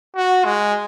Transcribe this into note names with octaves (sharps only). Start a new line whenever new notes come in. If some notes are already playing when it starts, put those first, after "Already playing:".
F#4
G#3